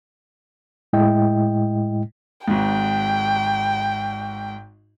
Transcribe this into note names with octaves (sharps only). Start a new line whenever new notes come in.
A2 G#3 E4 D#5 G5
G#1 G#2 G5